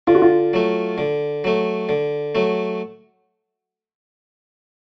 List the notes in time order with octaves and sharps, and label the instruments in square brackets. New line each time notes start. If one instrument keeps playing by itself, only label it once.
[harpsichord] D3 [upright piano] F4
[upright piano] F#4
F4
[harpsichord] F#3 A3
D3
F#3 A3
D3
F#3 A3